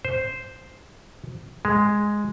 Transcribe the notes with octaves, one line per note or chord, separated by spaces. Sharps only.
C5
G#3